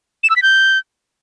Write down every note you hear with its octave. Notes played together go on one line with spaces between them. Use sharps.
E7
E6
B6
G6